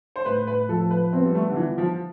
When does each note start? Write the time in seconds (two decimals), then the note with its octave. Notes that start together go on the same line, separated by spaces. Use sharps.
0.16 C5
0.26 A2 B4
0.47 B4
0.69 F3 A4
0.91 B4
1.12 B3 C4
1.25 G3
1.35 A3
1.49 D3
1.56 E3 F4
1.78 F3